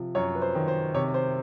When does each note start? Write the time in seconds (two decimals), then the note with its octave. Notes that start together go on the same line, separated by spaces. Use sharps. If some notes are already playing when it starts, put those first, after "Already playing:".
Already playing: C3 F3
0.15 F#2 C#5
0.35 B4
0.42 C5
0.55 D#3
0.68 C5
0.94 C3 C#5
1.14 C5